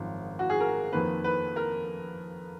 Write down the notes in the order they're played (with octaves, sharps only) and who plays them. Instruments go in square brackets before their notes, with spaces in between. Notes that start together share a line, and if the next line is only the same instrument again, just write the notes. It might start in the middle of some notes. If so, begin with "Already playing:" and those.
Already playing: [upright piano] G#1 F#2 F3
F#4
G#4
A#4
F2 D#3 A#3 B4
B4
A#4